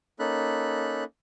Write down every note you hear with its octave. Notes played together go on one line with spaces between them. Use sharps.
A#3 C#4 D#4 A4 B5 F#6